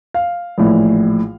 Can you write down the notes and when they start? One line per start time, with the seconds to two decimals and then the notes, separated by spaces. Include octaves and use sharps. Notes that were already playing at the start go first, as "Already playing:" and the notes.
0.14 F5
0.58 A#1 A2 E3